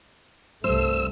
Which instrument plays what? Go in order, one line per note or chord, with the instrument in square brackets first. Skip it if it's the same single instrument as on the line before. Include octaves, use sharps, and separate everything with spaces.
[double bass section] C2 G2 A3 [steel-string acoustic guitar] C5 [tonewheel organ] E6